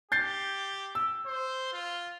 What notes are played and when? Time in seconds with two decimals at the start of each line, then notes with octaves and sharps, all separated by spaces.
0.12 G4 G6 A6 C7
0.95 E6
1.26 C5
1.73 F4